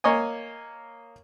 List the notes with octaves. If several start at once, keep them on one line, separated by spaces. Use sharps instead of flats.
A#3 C#5 D#5 G#5